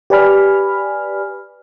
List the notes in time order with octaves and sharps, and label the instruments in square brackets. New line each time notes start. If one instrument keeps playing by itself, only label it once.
[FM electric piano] G4 B4 D5 G#5 B5 F6